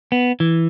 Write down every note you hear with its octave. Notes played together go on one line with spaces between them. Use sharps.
B3
E3